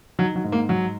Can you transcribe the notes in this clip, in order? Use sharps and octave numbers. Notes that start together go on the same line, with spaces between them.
D#3 F#3
F#3
G#2
A#3
G#2 F#3